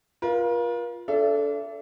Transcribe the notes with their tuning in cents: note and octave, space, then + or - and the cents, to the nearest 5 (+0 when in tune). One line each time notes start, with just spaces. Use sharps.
F4 +0 A#4 +45
D4 -25 A4 -10 E5 +35